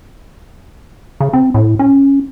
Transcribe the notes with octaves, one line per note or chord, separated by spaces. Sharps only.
C#3
C4
A2
C#4